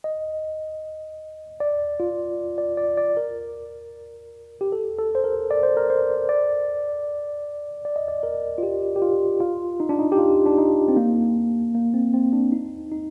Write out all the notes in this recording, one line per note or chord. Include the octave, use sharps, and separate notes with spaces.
D#5
D5
F4
D5
D5
D5
A#4
G4
A4
A4
C5
A#4
D5
C5
A#4
C5
D5
D5
D#5
D5
A#4
F4
G4
G4
F4
F4
D#4
D4
D#4
G4
F4
D4
D#4
C4
A#3
A#3
C4
C4
D4
D#4
D#4